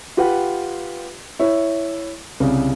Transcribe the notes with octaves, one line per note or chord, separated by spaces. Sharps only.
F4 G4 B4 F#5
E4 C#5
C2 C#3